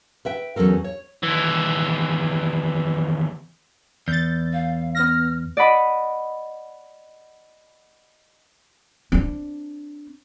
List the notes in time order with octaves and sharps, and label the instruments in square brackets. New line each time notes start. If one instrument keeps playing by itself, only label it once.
[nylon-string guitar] B4 E5 G5
E2 F#3 C#4 A4 A#4
C#5
[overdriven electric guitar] D#2 E3
[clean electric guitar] E2 [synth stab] G6 A6
[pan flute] F5
[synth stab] B3 A#6 [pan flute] F6
[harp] D5 D#5 F#5 B5 D6
[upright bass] C4 D4